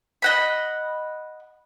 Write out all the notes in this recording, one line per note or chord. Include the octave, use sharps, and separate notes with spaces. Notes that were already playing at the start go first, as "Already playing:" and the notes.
D#5 F#5 B5